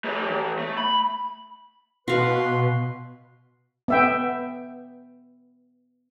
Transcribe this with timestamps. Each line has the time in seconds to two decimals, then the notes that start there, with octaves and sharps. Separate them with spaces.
0.05 A3 G4
0.28 A2 E3
0.59 A3
0.78 B5
2.08 B2 F#4 B4 F5 C6
3.88 B3 E5 G5